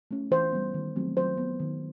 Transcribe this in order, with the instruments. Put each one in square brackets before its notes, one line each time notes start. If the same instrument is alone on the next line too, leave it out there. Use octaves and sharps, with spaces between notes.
[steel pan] A3 C#4
E3 C5
G3 B3
D#3
F#3 A3 C4
F#3 C5
B3
D#3